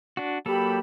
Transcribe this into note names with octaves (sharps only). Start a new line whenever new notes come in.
D4 F#4
F#3 A#3 G4 A4 B5